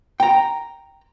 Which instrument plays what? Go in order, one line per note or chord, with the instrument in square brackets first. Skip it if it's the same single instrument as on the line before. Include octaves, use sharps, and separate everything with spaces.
[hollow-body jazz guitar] G5 A#5